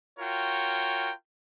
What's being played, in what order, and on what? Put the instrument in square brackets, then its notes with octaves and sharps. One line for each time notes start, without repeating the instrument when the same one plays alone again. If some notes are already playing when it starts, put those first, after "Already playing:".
[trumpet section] F4 F#4 A#4 C#5 G5